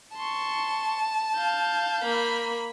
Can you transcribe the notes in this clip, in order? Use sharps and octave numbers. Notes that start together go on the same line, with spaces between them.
A5 C6 C#6
F5 G6
A#3 B5